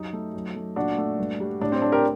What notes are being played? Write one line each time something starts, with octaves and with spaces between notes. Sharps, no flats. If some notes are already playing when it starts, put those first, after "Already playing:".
Already playing: F#2 D#4 G4
A3
F#2
A3
A#2 D4 F#4
A3
G2
G3
A2 D4
C4
A3 D4
G4 A#4